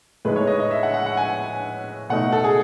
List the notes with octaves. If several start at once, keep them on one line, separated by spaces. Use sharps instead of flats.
A2 G#3 D#4 B4
C#5
D#5
D#5
E5
F#5
F#5
F#5
G#5
B2 A3 D#4 F#5
A4
G#4